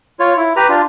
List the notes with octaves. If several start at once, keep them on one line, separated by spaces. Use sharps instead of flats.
F4 C#5
E4
G4 B4 A#5
D4 F4